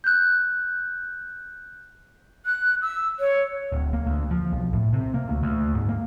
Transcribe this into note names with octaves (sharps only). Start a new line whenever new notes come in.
F#6 G6
F#6
E6
C#5
D1
A#3
D2
F3
B1
A2
C3
A#3
D2
D2
G#2
A#3